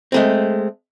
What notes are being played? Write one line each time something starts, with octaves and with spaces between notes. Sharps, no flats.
G#3 A3 C4